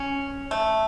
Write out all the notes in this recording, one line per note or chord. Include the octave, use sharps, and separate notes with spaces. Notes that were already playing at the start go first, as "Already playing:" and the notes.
Already playing: C#4
A3